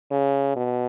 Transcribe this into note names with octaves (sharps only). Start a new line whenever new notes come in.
C#3
B2